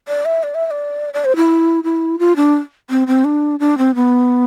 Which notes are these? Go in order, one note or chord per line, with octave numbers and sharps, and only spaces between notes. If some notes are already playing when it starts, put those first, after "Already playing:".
D5
E5
D5
E5
E5
D5
D5
C5
E4
E4
F4
D4
C4
C4
D4
D4
C4
B3